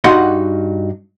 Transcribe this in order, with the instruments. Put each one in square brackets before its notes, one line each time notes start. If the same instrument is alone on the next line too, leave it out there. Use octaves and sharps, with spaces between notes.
[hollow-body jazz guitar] G2 D#4 F#4 D#5 F#5 C6